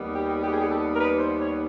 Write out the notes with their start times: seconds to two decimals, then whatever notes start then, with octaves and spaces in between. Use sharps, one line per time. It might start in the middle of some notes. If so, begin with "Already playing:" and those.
Already playing: D#2 D#3 G3 B3
0.15 G4
0.42 G4
0.52 G#4
0.60 G4
0.70 A4
0.94 A#4
0.99 B4
1.19 C5
1.40 C#5